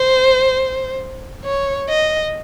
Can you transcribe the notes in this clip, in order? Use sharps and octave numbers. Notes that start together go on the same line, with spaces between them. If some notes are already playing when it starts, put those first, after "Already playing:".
Already playing: C5
C#5
D#5